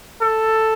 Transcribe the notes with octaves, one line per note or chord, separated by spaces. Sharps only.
A4